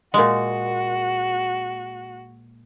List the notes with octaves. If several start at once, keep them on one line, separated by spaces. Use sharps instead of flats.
A#2 G#3 F#4